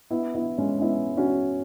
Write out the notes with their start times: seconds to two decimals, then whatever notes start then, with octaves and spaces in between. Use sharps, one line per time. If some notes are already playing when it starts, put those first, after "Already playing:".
0.11 B3 E4
0.35 B3 E4
0.58 G#3 C#4
0.78 C#4
0.81 B3 E4
1.17 C#4 F#4